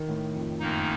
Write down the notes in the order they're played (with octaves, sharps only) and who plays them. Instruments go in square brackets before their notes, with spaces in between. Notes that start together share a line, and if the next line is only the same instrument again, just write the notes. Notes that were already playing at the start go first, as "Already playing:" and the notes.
Already playing: [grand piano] D#3
A2
F2
[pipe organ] F#2 D#3 A#3 D#4